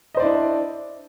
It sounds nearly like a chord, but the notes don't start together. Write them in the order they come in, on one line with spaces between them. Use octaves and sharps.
D#5 C5 D5 E4 D4